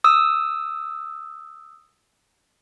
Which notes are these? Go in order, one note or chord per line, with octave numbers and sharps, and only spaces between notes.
D#6 E6